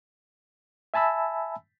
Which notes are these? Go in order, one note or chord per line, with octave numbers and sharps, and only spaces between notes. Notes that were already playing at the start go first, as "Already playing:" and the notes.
E5 G#5 A5 B5 E6